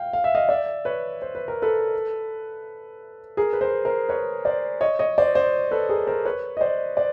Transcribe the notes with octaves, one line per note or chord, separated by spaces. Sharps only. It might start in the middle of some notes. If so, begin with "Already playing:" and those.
Already playing: F5 G5
F5
E5
D#5 F5
D5 E5
B4 C#5
C5
B4
A#4
A4 B4
G#4 A#4
B4
A#4 C5
A#4 C5
B4 C#5
C5 D5
C#5 D#5
C#5 D#5
C5 D5
C5 D5
A4 B4
G#4 A#4
A#4 C5
B4 C#5
D#5
C5 D5
C5 D5